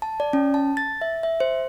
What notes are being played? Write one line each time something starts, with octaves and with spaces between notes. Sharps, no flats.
A5
D5
C#4
A5
A6
E5
E5
C5